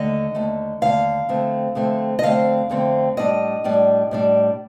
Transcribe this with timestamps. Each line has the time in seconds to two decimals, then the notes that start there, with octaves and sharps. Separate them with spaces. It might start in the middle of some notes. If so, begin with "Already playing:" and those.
Already playing: D#2 D3 A3 D#5
0.35 D#2 D3 A3
0.82 D#2 D3 A3 F5
1.29 F2 D3 A3 C4
1.75 F2 D3 A3 C4
2.19 D#5
2.23 F2 D3 A3 C4 F5
2.70 F2 D3 A3 C4
3.17 A2 G3 D4 D#5
3.64 A2 G3 D4
4.11 A2 G3 D4